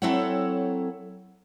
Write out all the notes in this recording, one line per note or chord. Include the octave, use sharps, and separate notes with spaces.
F#3 C4 E4 A4 C#5 F#5